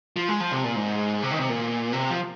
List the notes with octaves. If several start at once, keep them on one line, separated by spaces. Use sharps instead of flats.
F3
G#3
F3
C3
A#2
G#2
C3
D#3
C3
A#2
C3
F3